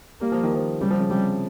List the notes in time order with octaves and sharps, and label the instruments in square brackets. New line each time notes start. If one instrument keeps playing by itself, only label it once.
[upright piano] G3 [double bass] A#3
[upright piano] F3
D#3
F3
[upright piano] C#3 [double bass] G3
[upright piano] F3
C#3
[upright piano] C3 [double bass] G3